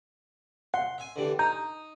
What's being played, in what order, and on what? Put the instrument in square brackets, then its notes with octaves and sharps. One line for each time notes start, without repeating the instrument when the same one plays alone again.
[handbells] F#5 [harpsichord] C6
[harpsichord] E5 G#5
D3 E3 G3
[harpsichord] D#4 D#6 [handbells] A#5 G6